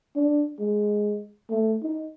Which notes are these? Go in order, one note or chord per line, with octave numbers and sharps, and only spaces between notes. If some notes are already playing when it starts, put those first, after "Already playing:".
D4
G#3
A3
D#4